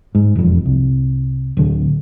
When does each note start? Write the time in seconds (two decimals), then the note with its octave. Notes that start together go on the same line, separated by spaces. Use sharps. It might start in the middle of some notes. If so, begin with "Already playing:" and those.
0.15 G#2
0.35 E1 F2
0.66 C2
1.57 D1 D3